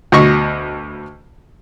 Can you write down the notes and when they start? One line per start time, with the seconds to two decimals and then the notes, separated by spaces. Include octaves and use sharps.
0.12 D2 B2 D#5 C#6